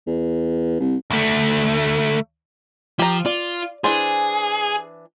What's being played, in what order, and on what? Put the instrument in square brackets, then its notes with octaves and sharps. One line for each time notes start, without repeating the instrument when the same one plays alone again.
[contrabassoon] E2
C2
[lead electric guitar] D2 A3
[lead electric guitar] F3 [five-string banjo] G4 A#5
[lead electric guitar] F4 [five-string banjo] D5
[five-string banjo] E3 D4 C5 [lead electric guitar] G#4